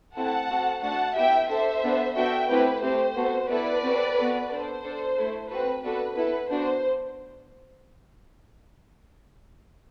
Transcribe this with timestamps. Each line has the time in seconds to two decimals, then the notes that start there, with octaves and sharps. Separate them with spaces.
0.16 A3 C4 E4 A4 F#5 A5
0.50 C4 F#4 A4
0.82 A3 D4 F#4 A4 F#5 A5
1.16 B3 E4 G4 E5 G5
1.49 D4 A4 C5 E5
1.83 B3 D4 A4
2.16 B3 D4 F#4 A4 E5 G5
2.49 A3 C4 E4 G4 B4
2.82 A3 C4 G4 C5
3.16 B3 F#4 A4
3.50 B3 E4 A4 B4 D5
3.83 C4 F#4 A4
4.16 B3 F#4 A4
4.49 D4 A4 C5
4.82 D4 A4
5.16 A3 E4 A4
5.49 C4 F#4 A4 B4
5.83 B3 D4 F#4 A4 B4
6.16 B3 E4 A4 B4
6.50 B3 D4 F#4 C5